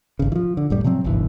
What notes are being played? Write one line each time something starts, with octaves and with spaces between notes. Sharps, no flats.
G#1 C#3
E3 F3
D3
F1 A2 G3
C3 F3 F#3 C4
F#1 B1 G2 E3